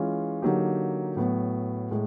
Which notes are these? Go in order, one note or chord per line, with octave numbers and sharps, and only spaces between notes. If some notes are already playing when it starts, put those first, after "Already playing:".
Already playing: E3 G#3 C#4 F4
D3 F#3 A#3 D#4 G4
A2 F#3 B3
A2 G#3